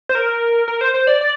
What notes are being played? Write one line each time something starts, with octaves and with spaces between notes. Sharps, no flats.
C5
A#4
A#4
C5
C5
D5
D5